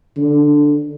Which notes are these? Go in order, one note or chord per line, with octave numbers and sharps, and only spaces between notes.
D3